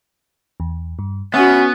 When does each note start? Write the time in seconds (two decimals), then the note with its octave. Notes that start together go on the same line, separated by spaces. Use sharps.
0.60 E2
0.99 G2
1.34 B3 C#4 F#4 E5